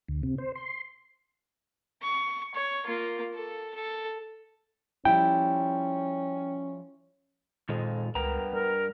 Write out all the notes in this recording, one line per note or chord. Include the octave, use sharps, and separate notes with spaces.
D2
C3
C5
C6
C#6
C#5
A#3 F4
A4
A4
F3 G3 C#4 E4 G5
F2 A#2 D#3 G#3 F4
C#2 G2 B3 A#4 G5 A#5
G3 A#4